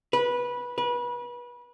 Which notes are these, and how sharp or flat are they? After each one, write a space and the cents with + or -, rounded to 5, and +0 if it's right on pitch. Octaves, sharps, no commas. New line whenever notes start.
B4 -15
B4 -30